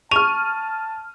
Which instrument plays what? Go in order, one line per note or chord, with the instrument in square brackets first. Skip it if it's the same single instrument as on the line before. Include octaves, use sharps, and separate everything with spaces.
[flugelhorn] A5 [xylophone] C#6 F7 [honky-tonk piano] F6 D#7